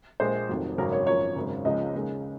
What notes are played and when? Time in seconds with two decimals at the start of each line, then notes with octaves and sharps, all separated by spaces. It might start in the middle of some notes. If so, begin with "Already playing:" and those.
0.20 A#1 A#2 F3 G#3 C5
0.49 F1 F2 D#3 F#3
0.78 G#1 F#2 C#3 F#3 A#4
0.92 C#5
1.07 G#1 F#2 F3 C#5
1.36 G#1 F#2 C#3
1.65 C#2 C#3 F3 G#3 D#5
1.94 D#2 C#3 G#3